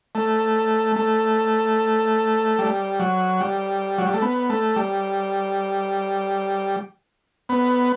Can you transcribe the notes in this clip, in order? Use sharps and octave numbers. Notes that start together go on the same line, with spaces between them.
A3
A3
G3
F#3
G3
F#3
G3
A3
B3
A3
G3
B3